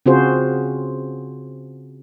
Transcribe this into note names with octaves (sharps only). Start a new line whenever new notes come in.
C#3 C4 F4 F#4 G#4 C5